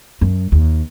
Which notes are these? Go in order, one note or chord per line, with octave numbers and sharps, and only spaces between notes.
F#2
D#2